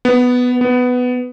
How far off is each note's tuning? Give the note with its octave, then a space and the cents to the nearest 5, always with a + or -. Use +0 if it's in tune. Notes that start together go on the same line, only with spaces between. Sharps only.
B3 +5
B3 +10